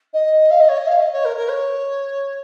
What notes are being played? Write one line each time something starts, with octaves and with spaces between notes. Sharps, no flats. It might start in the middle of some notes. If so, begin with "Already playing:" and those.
D#5
F5
D#5
C#5
D#5
F5
D#5
C#5
A#4
A#4
C#5